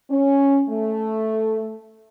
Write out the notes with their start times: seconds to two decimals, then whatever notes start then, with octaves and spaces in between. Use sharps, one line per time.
0.11 C#4
0.69 A3